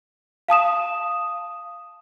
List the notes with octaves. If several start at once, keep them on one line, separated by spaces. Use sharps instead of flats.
F5 A5 D#6 E7